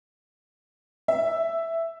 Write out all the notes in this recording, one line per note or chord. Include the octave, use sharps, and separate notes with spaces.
E5